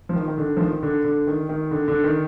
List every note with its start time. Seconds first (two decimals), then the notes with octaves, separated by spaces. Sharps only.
0.09 F3
0.16 D#3
0.28 D#3
0.38 D3
0.57 F3
0.60 D#3
0.83 D3
1.04 D3
1.27 D#3
1.49 D#3
1.71 D3
1.88 D3
2.04 D#3